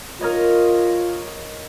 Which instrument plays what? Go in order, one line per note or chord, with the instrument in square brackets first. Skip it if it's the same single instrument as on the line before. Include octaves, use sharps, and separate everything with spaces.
[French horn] F4 [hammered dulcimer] A#4 C#5 D#5